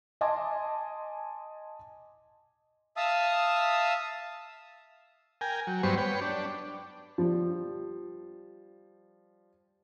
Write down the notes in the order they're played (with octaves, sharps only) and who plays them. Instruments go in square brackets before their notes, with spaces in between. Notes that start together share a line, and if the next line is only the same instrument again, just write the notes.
[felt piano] D#5 G#5 A5 C6 D6
[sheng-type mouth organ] E5 F5 A5 D#6 E6
[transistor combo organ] A#4 G5 G#5
F#3
G2 F#3 G3 B3 C5 C#6
B4 C#5 G5
D4
[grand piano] F3 G3